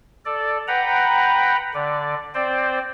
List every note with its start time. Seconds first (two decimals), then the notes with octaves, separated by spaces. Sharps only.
0.26 A4 D5
0.68 B4 F#5 G5 A#5 B5
1.74 D3 D5
2.34 C4 C5 D5 G5